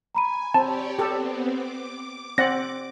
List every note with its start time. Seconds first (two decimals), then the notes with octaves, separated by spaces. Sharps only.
0.15 G#5 A#5 B5 D#7
0.54 C4 G4 C#5 D5 A5
0.99 B3 C4 G4 A4
1.46 D6
2.38 C4 D5 F#5 A#6